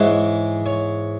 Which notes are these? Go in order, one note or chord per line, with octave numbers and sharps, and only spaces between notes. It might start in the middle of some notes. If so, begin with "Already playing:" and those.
Already playing: G#2 E3 G#3 C#5
C#5